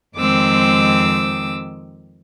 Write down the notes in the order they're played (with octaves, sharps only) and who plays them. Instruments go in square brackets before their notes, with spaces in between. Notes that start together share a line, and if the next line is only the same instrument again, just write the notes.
[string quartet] F2 D#3 G#3 C4 D6 E6